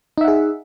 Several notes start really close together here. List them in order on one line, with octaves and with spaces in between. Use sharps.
D#4 E5 F#5 G#4